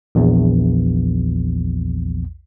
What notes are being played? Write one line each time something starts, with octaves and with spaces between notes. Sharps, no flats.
A#1 E2